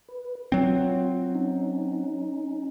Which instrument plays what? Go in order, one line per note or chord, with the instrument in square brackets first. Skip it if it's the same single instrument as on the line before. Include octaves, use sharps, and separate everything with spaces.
[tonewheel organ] B4
[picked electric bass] F#3 C4 [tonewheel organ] F4
[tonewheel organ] C#4 D#4